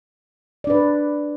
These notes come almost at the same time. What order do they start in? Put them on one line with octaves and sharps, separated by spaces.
D5 D4 B4